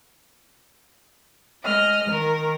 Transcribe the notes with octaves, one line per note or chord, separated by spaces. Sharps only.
G#3 D#5 F6
D#3 A#4